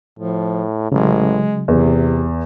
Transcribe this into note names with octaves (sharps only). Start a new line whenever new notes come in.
A2 F3
A1 C#3 F#3 G#3
A1 E2 C3